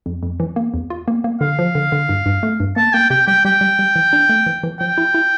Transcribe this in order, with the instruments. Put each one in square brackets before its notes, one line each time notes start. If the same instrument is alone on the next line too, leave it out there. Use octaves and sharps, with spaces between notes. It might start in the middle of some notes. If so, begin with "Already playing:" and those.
[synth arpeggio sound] F2
F2
E3
A#3
E2
F4
A#3
A#3
[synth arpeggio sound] D3 [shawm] F5
[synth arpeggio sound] F3
D3
D3
G2
G2
A3
G2
[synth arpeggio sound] A#3 [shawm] A5
[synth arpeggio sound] A#3 [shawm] G5
[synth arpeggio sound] C3 [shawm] G5
[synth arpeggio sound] G3 [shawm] G5
[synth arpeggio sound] G3 [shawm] G5
[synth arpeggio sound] G3
G3
E3
D4
A3
E3
E3
[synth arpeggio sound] F3 [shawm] G5
[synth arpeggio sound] E4
E4